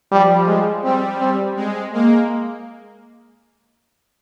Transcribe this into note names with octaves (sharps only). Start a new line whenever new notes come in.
F3 G3
G#3
G3 C4
C4
G#3 C4
G#3 A#3